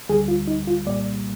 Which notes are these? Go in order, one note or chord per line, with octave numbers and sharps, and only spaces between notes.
D2 D3 G3 G#4
F4
D#4
F4
C2 A#2 G3 A#3 D5